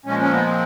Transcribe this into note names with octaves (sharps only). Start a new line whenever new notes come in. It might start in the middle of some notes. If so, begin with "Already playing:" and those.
A#2 F3 G#3 C#4
C#4
B3
C4